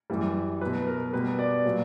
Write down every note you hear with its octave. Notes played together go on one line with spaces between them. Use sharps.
F#2 E3 G3
F#3 B4
B2
A#4
B2 G3 B4
D5
A#2 F#3